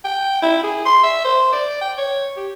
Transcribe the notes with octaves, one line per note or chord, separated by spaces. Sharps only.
G5
E4
G#4
C6
E5
C5
D5
G5
C#5
G4